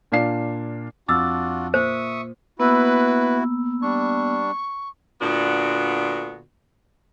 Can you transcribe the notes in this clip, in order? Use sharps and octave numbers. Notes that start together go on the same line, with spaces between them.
A#2 D4 F5 C7
F2 D4 F4 F#4 D6 E6 F6 A6
A#2 C5 E5 C#6 D#6
A#3 B3 E4 F#4 B4 E6
G3 D4 C#6
A#2 D3 B3 D4 F#4